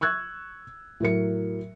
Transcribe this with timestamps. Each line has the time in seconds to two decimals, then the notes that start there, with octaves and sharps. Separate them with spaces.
0.01 C#6 E6 F#6 G#6
1.00 A2 F#3 A#4 C#7